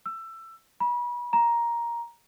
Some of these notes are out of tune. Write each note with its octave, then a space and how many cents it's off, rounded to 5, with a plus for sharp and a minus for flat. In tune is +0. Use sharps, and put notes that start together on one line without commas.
E6 +20
B5 -35
A#5 +10